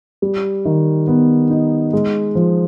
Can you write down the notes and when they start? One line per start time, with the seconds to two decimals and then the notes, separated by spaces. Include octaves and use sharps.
0.22 G3
0.65 D#3
1.07 B3
1.50 D#4
1.93 G#3
2.35 F3